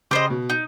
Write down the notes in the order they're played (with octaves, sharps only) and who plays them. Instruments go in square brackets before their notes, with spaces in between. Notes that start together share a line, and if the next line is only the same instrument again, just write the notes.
[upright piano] C#3 [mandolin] G4 C5 D#5
[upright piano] B2
[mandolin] D#4